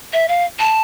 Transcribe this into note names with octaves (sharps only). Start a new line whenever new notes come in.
E5
F5
A5